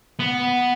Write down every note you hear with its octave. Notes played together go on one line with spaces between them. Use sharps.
B3